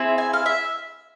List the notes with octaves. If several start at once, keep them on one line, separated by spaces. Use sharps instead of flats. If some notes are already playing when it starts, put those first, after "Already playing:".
Already playing: C4 E4 G#4
G#5
F5
E5